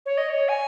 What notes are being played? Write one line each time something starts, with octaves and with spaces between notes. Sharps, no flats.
C#5
D#5
C#5
G#5